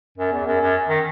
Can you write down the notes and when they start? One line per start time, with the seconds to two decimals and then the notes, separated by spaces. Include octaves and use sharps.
0.17 F#2
0.32 E2
0.46 F#2
0.61 F#2
0.89 D#3